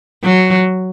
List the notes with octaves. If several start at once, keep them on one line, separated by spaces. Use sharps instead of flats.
F#3